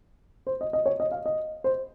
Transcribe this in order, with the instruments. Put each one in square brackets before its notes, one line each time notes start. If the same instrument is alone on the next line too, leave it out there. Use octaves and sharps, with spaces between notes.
[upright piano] C5
D#5
D#5
C#5
D#5
F5
D#5
C5